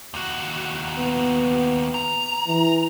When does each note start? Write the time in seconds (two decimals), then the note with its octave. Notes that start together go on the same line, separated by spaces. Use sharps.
0.14 D#2 F#4
0.97 B3
1.94 A#5
2.47 E3